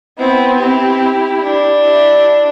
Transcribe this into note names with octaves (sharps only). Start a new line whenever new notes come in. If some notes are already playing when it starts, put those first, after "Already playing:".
B3 C4 E4
C4 E4 G4
D4
E4 G4